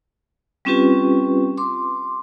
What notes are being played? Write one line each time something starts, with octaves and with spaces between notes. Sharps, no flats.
G3 C4 C#4 F4 G4 B4
C6 D6